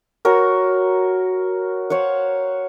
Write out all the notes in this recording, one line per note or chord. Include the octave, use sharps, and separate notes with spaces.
F#4 A#4 C#5
C5 C#5 F5 F#5